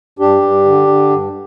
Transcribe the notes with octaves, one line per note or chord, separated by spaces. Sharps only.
G2 D4 G4
G2
D3
D3
G2